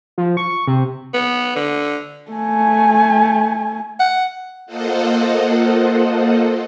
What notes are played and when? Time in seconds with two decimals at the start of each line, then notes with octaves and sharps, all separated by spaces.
0.18 F3
0.37 C#6
0.67 C3
1.14 B3
1.56 D3
2.31 A3 G#5
4.00 F#5
4.66 A#3 F4 A4 C5 D#5 F#5